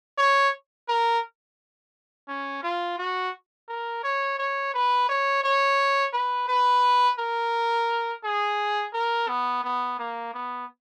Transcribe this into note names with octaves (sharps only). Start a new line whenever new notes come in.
C#5
A#4
C#4
F4
F#4
A#4
C#5
C#5
B4
C#5
C#5
B4
B4
A#4
G#4
A#4
B3
B3
A#3
B3